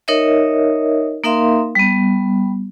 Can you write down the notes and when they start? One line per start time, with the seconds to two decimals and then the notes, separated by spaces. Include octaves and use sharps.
0.08 D#4 A#4 C#5 D#5 E5
1.24 A#3 D#4 A#4 E5 F5 C6
1.75 G3 B3